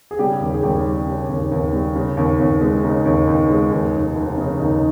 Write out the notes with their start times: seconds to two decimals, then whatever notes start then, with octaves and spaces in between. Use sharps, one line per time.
0.11 G#4
0.19 C#3 G3 G4
0.41 D#2
0.54 G#4
0.63 D#2 G3 G4
0.85 G3
1.07 C#3
1.29 D#2
1.52 D#2
1.73 G3
1.96 C#3
2.17 D#2
2.40 D#2
2.61 G#3
2.83 C#3 D#4
3.06 D#2
3.27 D#2
3.50 G#3
3.72 D#2
3.94 F1
4.16 F1
4.37 C#3
4.59 D#2 D#4